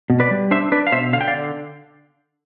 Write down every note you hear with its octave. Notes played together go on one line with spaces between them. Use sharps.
B2
B4 D5
G3
D4 C5 E5
D4 B4 D5
F5
B2 C5 E5
D3 F5
G5
D5 F5
D3